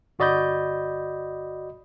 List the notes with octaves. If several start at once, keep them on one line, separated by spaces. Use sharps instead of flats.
G1 F#4 D5 D#5 B5 G6